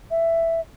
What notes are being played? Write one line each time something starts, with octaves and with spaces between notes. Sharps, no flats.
E5